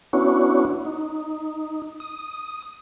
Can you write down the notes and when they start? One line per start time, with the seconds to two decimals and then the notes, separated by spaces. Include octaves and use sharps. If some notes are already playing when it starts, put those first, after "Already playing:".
0.13 B3 C#4 D4 E4 F#4 C#5
0.85 D#4
2.00 D#6